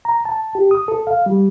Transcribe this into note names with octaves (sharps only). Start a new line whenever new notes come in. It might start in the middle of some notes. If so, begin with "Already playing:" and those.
A#5
A5
G4
D#6
A4
F5
G3